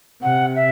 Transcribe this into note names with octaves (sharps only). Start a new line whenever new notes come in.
C3 F#5
E5